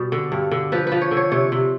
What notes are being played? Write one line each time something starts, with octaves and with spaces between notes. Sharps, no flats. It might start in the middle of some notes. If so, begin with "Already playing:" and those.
Already playing: B2 G3
D3
G2
D3
F3 B4
B4
F3
C#5
D3
C#5
C3 C#5
C3